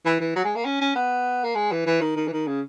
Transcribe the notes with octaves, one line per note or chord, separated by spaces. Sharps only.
E3
E3
F#3
G#3
A#3
C#4
C#4
B3
A#3
G#3
E3
E3
D#3
D#3
E3
D#3
C#3